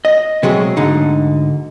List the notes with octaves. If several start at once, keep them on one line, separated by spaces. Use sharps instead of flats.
D#5
B2 F#3 G#3 A3 C4 G#4
D2 G#2 D3 D#4